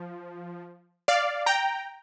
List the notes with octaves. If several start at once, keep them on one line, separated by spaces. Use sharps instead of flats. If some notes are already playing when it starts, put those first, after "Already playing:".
Already playing: F3
D5 F5
G5 A#5